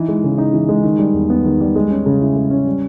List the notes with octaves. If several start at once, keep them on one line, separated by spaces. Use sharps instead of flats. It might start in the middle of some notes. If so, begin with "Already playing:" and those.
Already playing: E3 D#4
G#3
C#3
D#4
E3
G#3
D#3
G3
E2
B3
D#3
G3
G#3
C#4
C#3
E4
G#3
C#4
G3